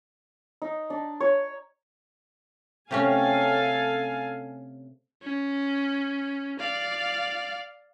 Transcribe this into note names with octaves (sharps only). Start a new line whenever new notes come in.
D#4
D4
C#5
C3 A3 C#4 A4 F5 G#5
C#4
D5 F5